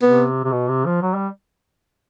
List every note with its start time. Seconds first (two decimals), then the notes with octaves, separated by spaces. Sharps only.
0.02 C3 B3
0.44 C3
0.52 B2
0.68 C3
0.85 F3
1.02 F#3
1.14 G3